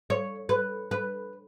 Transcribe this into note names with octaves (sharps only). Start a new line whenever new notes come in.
C#5
B4
B4